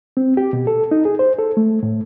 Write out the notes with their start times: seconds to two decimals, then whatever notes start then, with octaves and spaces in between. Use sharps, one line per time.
0.17 C4
0.37 G4
0.53 B2
0.67 A4
0.91 D#4
1.05 G#4
1.19 C5
1.38 A4
1.57 A3
1.83 A2